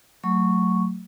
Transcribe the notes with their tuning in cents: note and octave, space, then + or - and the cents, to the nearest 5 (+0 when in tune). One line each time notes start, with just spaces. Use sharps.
F#3 +0 A3 +20 C#6 +0